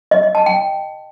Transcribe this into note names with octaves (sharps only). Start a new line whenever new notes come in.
D#5
D#5
A5
G5